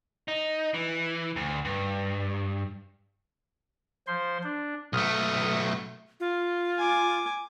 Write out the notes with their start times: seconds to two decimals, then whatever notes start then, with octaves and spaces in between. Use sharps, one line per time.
0.28 D#4
0.74 E3
1.36 D2
1.65 G2
4.07 F3 C5 C6
4.44 D4
4.93 B1 A3 D#6 F6
6.20 F4
6.78 G#5 D6